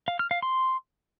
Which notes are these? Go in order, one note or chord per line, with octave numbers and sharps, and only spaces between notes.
F5
F6
F5
C6